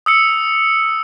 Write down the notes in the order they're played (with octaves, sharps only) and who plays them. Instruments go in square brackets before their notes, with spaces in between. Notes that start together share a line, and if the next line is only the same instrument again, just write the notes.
[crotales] D#6 E6 C#7